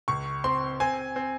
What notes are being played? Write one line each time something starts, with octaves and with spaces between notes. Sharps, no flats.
C#2 C#6
C4 C6
C4 G#5
C4